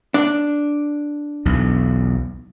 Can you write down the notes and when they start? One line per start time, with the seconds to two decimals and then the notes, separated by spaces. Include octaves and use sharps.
0.14 D4
1.46 B1 E2